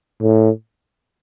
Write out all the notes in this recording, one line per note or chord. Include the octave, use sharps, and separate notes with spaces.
A2